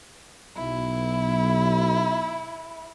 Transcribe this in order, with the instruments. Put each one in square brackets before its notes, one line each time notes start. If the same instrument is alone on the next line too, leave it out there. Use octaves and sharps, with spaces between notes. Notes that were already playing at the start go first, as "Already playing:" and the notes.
[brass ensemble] B1 [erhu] E4